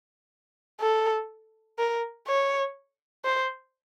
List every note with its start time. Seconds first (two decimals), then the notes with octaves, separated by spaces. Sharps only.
0.81 A4
1.79 A#4
2.28 C#5
3.25 C5